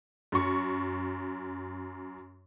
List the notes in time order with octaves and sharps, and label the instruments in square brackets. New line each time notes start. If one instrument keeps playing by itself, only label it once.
[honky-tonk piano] F#2 C#6